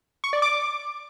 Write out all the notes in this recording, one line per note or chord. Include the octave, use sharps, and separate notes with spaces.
C#6
D5
D6